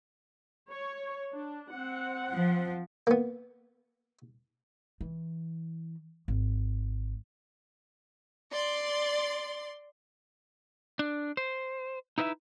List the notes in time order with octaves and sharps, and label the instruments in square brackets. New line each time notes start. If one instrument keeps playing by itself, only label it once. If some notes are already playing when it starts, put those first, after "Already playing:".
[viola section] C#5
D4
C4 F#5
[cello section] F3
[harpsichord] A#3 B3
[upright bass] E3
G#1
[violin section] D5 C6
[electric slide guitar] D4
C5
D#4 E4 B4 D#5 E5